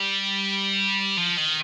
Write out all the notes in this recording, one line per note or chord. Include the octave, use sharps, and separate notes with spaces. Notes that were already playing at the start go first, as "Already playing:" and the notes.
Already playing: G3
F3
D#3